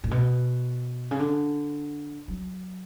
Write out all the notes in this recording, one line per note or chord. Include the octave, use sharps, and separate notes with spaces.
A2
B2
C#3
D3
F#3